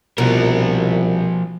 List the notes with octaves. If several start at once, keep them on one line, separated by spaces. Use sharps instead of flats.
C2 B2 F3 A#4